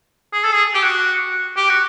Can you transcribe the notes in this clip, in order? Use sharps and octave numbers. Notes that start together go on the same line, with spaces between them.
G#4
A4
G#4
G4
F#4
G4
F#4